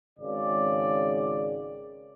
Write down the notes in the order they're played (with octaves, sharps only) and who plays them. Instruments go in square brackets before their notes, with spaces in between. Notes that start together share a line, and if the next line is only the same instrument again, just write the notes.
[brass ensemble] G#1 C#3 D5